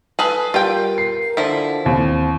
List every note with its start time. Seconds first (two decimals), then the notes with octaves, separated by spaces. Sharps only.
0.19 G#4 A4 B4
0.54 G3 F4 A#4 G5
0.98 C7
1.37 D3 F3 E4
1.84 D#2 E3 C4